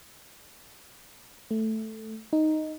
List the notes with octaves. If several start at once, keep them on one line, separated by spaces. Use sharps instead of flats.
A3
D#4